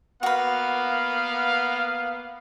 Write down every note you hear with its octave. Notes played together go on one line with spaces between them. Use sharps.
A#3 B3 F#4 B4 F5